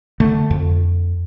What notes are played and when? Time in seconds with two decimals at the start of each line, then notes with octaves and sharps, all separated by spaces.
0.20 D3 A3
0.51 F2